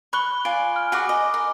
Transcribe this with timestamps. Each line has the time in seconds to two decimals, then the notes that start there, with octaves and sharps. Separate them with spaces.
0.13 B5 C#6 F#6 G7
0.45 F4 D5 G#5 D7
0.76 F6
0.92 F#4 G#4 F#5 G#5 D6
1.09 D#5
1.34 A#4